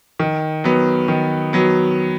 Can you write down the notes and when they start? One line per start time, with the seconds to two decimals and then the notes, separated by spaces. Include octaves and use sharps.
0.19 D#3
0.64 F#3 B3
1.08 D#3
1.53 F#3 B3